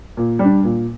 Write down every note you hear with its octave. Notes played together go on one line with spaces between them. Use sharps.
A#2
G3
D4
A#2